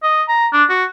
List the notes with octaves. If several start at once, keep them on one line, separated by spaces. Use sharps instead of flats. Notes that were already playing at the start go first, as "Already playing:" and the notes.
D#5
A#5
D4
F#4